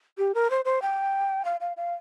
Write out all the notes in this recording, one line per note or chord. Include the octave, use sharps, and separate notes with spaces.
G4
A#4
C5
C5
G5
F5
F5
F5